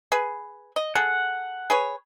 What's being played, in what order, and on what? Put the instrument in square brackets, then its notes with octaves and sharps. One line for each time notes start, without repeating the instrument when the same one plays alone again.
[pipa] G#4 B4
D#5
[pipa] G#4 A4 [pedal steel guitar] F#5
[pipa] G#4 B4 C#5